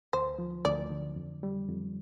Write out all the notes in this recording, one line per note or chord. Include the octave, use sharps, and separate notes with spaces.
D2 C5
F3
D2 D5
D3
F2
G3
F2